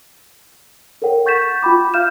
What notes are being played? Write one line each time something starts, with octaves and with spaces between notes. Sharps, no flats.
A4 A#4 C#5 F#5 G5
F#5 C#6 G6 A6 B6 E7
F4 G5 B5 D6
F5 F6 G6 E7